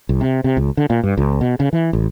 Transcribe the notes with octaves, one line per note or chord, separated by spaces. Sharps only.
C2
C3
C3
C#2
D3
A#2
G2
C#2
B2
C#3
E3
A1